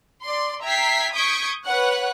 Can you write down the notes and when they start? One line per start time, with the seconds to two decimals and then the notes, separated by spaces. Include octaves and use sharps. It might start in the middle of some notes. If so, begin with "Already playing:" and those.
0.23 D5 C6
0.63 E5 G5 A#5 G#6 B6 C7
1.14 C#6 D#6 G6 G#6 B6 D7
1.66 B4 C#5 F#5 F#6